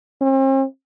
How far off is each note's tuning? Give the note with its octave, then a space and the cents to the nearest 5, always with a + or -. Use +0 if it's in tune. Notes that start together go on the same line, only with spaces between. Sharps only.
C4 +45